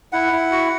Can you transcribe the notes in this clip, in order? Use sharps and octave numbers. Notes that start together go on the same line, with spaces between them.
E4 F#5
E4
F#4